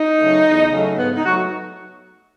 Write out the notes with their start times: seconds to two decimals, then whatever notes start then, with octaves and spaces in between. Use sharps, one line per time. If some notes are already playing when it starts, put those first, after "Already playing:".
Already playing: D#4
0.18 C#3 F#3 A3
0.45 E2
0.72 C#3 F#3 A3
0.97 G#2 B3
1.15 D#4
1.24 F#3 A3 F#4